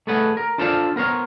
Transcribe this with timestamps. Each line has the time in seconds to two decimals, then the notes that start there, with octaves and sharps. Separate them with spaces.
0.07 A3 G#4 A4 B4 C#5 F#5
0.37 A#4
0.58 D4 F4 A4 C5 D5 F5
0.96 B3 A#4 C5 C#5